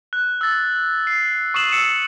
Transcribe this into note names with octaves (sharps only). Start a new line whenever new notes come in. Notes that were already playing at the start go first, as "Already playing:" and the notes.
F#6
E6 A6
C7
C#6 D#6 C7 E7 F#7
E6 C#7 E7